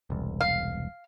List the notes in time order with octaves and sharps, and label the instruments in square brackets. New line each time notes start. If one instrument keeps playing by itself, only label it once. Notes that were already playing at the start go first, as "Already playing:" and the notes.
[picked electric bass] E1 C2
[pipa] F5